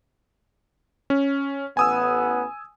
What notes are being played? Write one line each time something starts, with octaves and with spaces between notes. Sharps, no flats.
C#4
A1 B3 G#5 D#6 E6